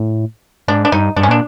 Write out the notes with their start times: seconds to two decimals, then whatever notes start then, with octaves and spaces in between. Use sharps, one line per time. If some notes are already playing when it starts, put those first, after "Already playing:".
Already playing: A2
0.68 G#2 D4
0.85 D4
0.92 G2 D#4
1.16 G2 D4
1.23 C#4
1.29 A#2 D4